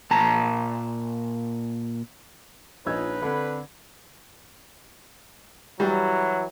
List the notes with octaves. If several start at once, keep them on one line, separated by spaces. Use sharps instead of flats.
A#2 A5 A#5
A#1 F3 C#4 D#4 B4 E6 G#6
D3 C4 A4 B5
E3 F#3 G3